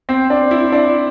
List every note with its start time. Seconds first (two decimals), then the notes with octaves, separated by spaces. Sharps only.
0.09 C4
0.30 D4
0.51 E4
0.72 D4